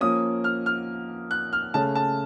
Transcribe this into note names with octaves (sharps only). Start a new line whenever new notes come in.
F3 A#3 C#4 D#6
F6
F6
F#6
F6
C#3 A3 C#4 A5
A5